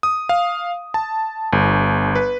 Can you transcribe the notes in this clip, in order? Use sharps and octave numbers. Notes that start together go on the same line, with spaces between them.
D#6
F5
A5
G1
B4